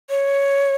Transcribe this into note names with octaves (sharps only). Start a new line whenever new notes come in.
C#5